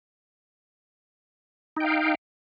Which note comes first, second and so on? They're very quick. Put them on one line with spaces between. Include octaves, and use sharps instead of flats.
D#4 G5 F5